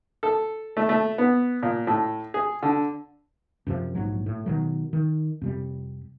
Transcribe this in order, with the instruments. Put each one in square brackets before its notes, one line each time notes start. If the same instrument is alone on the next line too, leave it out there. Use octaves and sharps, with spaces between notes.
[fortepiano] A4
A3
A3
B3
A#2
A2
G#4
D3
[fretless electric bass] F#2 C3 F3
A#1 G#2 F#3
A2
B2 D#3 F#3
D#3
F2 C3 G3